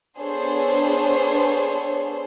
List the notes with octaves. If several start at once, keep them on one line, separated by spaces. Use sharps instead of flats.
B3 D4 G#4 A4 C5 C#5